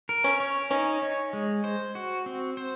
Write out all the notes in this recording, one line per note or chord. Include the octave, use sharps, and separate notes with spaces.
A#4
C#4
C#5
C#4 D#4
C#5
G#3
C5
F#4
C4
C5